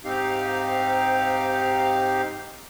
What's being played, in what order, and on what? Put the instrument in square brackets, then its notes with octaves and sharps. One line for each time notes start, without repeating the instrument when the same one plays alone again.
[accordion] G#2 C4 D#4 G4 F5